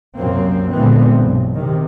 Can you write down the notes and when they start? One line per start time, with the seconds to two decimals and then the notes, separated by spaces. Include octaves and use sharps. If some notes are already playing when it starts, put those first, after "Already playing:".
0.16 C2 F#2 A#3 C4
0.71 A#2 D3 E3 G#3 B3 C4
1.16 B1 G2
1.54 C3 D#3